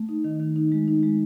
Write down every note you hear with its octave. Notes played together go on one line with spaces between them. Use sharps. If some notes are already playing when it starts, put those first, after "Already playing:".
Already playing: A3
D#4
D#3
D#3
D#4
G#3
D#4
G#3